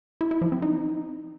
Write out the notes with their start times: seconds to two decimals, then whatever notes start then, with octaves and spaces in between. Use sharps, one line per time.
0.21 E4
0.31 E4
0.42 F3
0.52 C4
0.62 D#4